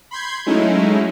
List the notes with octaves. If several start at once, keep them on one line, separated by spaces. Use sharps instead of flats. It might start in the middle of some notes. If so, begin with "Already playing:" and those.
B5 C6 G6 G#6
F#3 G#3 A3 C#4 D#4 E4